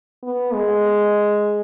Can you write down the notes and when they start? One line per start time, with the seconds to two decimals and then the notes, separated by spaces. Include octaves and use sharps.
0.23 B3
0.54 G#3